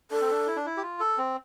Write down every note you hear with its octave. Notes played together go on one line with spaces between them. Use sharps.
D4 A4
C4
D4
E4
D4
E4
G4
F4
A4
C4